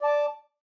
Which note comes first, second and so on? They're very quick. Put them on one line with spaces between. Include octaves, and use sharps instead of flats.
D5 A5 D6